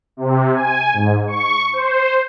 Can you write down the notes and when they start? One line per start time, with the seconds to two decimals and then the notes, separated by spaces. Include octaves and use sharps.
0.17 C3
0.53 G#5
0.93 G#2
1.27 C#6
1.73 C5